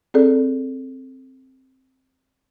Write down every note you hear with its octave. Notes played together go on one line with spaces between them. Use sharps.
C4 G#4 A4 D5